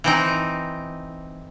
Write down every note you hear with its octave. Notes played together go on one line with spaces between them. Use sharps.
E3 C4 D#4